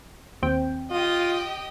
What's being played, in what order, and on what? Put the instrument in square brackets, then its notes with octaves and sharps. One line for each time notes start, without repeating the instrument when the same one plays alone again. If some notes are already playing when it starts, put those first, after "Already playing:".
[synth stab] D#2 C4 G5
[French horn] F4 [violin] G4 D#5